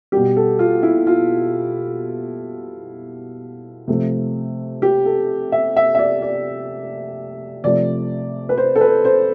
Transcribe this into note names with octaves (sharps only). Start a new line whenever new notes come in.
B2 G3 G4
A4
F4
E4
F4
C3 F3 A3
G4
A4
E5
E5
E5
D5
D5
C3 F3 A3 D5
B4
C5
A4
B4
C5